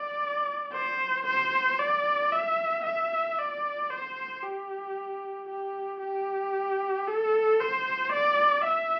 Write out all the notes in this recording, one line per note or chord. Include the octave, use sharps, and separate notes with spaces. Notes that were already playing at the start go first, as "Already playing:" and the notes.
Already playing: D5
C5
C5
D5
E5
E5
D5
C5
G4
G4
G4
A4
C5
D5
E5